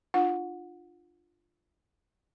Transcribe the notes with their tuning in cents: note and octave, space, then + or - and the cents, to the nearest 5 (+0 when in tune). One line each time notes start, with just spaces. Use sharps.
D4 +30 F4 +0 F#5 -20